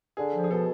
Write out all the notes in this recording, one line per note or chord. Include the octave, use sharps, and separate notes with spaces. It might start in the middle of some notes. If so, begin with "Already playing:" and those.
D3 G#4
F3
G#4
B2 A4